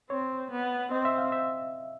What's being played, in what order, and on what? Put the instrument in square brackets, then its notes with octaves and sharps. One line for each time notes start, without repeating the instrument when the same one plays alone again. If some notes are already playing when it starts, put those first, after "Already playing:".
[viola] C4 [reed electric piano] C#5
[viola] B3
[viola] C4 [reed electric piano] D#5
[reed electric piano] E5
F5
E5